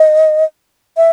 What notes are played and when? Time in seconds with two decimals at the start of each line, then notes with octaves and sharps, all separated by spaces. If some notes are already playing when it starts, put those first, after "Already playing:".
Already playing: D#5
0.97 E5